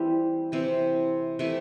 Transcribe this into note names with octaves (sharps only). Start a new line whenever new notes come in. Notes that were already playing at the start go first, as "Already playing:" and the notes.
Already playing: E3 G3 C4 G4
C3 E3 C4
C3 E3 A3 E4